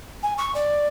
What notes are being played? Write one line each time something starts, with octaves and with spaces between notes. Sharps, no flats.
G#5
C#6
D5